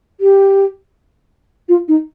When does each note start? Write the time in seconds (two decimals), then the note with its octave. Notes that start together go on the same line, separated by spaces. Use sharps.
0.20 G4
1.68 F4
1.88 D#4